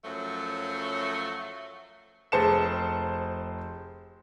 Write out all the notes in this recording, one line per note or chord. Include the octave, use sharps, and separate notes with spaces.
F#2 F3 F#3 A3
F1 G#4 C5 A5 C#7 E7